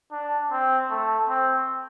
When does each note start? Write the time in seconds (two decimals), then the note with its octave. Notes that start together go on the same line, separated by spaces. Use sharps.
0.12 D4
0.51 C4
0.90 A3
1.29 C4